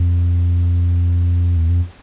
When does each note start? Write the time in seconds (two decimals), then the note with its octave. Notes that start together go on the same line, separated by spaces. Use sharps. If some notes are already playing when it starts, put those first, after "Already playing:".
Already playing: F2
1.57 E2
1.69 F2